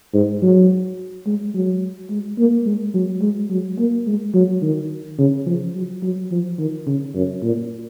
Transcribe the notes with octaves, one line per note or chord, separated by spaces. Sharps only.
G#2
F#3
G#3
F#3
G#3
A#3
G#3
F#3
G#3
F#3
A#3
G#3
F#3
D#3
C#3
F3
F#3
F#3
F3
D#3
C#3
F#2
A#2